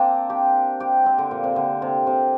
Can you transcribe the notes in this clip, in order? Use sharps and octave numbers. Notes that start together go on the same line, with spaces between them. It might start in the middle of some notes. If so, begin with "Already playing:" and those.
Already playing: A#3 C4 D4
G4
G4
C4
D3
A#2
C3
D3
C3
C3